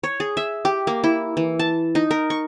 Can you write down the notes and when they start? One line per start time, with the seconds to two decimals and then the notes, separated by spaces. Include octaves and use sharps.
0.03 C#5
0.20 G#4
0.37 E5
0.65 G4
0.87 A#3
1.04 E4
1.37 E3
1.59 A5
1.95 D#4
2.11 A#4
2.30 C#6